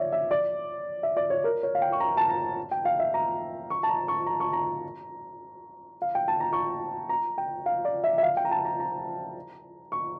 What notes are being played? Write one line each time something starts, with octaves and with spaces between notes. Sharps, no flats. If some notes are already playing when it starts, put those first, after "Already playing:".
Already playing: C#5 D5 E5
E5
D5
E5
D5
C#5
A#4
C#5
F5
G5
C#6
A#5
A5
A#5
G5
F5
E5
A#5
C#6
A5
A#5
C#6
A#5
C#6
A#5
F5
G5
A5
A#5
C#6
A#5
G5
F5
D5
E5
E5
F5
G5
A#5
A5
A#5
A#5
C#6